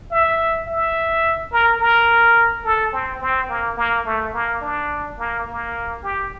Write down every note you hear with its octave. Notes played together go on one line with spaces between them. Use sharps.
E5
E5
A#4
A#4
A4
C4
C4
A#3
A#3
A3
A#3
D4
A#3
A#3
G4